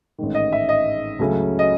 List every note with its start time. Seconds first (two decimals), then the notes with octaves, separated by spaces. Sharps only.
0.18 A1 G#2 D#3
0.35 D#5
0.52 E5
0.69 D#5
1.19 C#2 C#3 F#3 A3 C#4
1.59 D#5